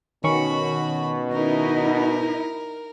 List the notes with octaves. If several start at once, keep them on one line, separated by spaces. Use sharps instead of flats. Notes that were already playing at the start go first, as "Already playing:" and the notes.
B2 D#3 C#4 F#4 B5 C#6
D#4 E4 A#4